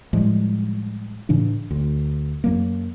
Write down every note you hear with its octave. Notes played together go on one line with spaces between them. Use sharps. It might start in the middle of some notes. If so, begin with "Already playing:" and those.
A2 F3 G3 G#3
A2 C#3 E3 D4
D2
F#2 F#3 A#3